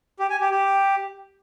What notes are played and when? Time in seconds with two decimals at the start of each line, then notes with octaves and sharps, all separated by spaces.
0.19 G4
0.30 G#5
0.40 G4
0.51 G4